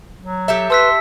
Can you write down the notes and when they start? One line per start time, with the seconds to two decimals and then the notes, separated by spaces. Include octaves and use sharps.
0.20 F#3
0.48 G4 A4 E5
0.70 B4 A5 C6 E6 B6